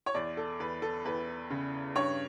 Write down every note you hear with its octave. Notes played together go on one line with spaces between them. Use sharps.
C#5
E2 D5
A4
E2 B4
A4
E2 B4
C#3
G2 C#5